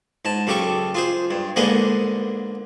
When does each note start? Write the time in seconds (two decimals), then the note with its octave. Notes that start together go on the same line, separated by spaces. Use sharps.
0.25 G#2 A5
0.47 F#2 C#3 G4 A4 C#6
0.94 F4 G#4 C5
1.31 G2
1.56 G#2 D3 A#3 B3 G#4 A#5